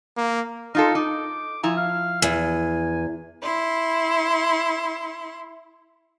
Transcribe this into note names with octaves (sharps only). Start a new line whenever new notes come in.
A#3
D#4 F4 A4 A#4
D#4 D6
F3 E4 G#5 A#5
F5
E2 G#5
E4 C6